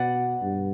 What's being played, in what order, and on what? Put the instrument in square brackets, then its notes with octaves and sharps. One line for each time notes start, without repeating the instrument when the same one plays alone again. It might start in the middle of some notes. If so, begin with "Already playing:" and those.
Already playing: [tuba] B2 [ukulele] B4 D5 F#5
[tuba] G2